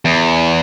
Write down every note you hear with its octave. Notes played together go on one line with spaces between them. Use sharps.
E2